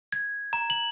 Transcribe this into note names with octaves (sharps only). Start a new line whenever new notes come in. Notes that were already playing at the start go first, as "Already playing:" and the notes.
G#6
A#5
F#7